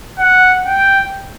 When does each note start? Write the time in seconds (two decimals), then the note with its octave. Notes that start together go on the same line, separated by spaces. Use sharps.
0.19 F#5
0.66 G5